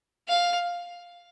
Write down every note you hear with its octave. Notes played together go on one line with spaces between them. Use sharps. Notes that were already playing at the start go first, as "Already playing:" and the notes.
F5